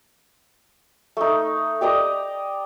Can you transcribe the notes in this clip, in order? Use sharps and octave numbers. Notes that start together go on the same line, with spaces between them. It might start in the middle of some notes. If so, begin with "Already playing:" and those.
A3 D#4
G4 D5 D#5 A#5